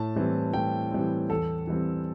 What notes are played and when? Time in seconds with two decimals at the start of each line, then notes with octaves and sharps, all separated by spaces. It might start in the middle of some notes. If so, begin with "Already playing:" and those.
Already playing: A2 A5
0.16 E3 G3 C4
0.53 A2 G5
0.91 E3 G3 C4
1.29 E2 A4
1.67 E3 G3 C4